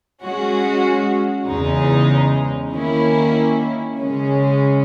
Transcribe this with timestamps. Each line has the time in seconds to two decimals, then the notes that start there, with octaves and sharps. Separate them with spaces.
0.22 G#3 C#4 F#4
1.47 E2 C#3 G#3 D#4
2.73 D#3 A#3 C#4 E4
3.98 C#3 G#3 C#4